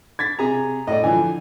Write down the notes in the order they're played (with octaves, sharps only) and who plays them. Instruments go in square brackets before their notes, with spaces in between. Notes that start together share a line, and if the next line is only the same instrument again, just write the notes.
[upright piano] G#6 A6 B6
[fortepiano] C3 G#4 A#5
[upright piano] A2 [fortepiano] D5 D#5
[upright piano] D3 E3 F3 [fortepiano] G#5